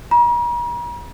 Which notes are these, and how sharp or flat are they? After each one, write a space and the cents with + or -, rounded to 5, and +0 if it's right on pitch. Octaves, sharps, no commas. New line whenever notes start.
A#5 +45